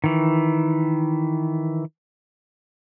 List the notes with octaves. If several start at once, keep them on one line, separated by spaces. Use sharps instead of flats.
D#3 E3